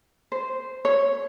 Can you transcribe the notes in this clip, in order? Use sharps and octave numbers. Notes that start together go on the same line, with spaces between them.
C5
C#5